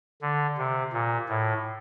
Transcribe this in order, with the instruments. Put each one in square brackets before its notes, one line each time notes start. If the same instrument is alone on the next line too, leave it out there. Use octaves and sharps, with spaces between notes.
[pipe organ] D3
C3
A#2
A2